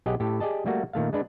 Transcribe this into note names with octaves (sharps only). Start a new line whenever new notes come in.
B1 G4 G#4 D#5 F#5
A2 G4 A4
G4 G#4 D5 D#5 A5
G3 A3 A#3 F#4
A#2 D#3 A3 F5
G#3 D4 B4